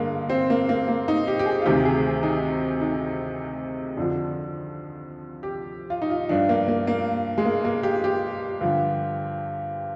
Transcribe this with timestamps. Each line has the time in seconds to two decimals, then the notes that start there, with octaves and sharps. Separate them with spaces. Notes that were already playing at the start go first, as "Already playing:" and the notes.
Already playing: G2 D3 G#3 A#3
0.30 C4
0.50 A#3
0.69 A#3
0.88 A#3
1.08 D#4
1.27 G4
1.39 G4
1.46 G#4
1.62 F4
1.66 D2 C3 D#3 G4
1.85 G#4
2.23 D#4
2.81 D#4
3.97 F2 D3 F3 D4
5.43 G4
5.90 F4
6.02 D#4
6.10 F4
6.29 G2 F3 D4
6.49 A#3
6.68 A#3
6.87 A#3
7.38 G#3
7.45 A#3
7.65 A#3
7.83 G4
8.04 G4
8.61 G2 D3 F3